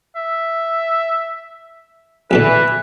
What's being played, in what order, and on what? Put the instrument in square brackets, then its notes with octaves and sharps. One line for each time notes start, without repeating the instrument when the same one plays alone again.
[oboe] E5
[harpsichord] A#1 B2 D3 [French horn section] E3 [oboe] B4